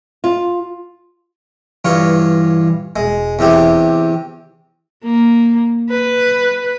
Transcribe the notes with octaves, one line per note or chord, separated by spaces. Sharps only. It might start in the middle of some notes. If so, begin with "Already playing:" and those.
F4
G2 E3 F4 C#5
E1 G#3
E2 C3 G4
A#3
B4